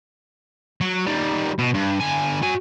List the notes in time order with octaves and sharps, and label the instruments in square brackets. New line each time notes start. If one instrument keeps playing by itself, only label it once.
[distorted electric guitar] F#3
D#3 G3
B2
G2
D3 G#5
F#4 G#5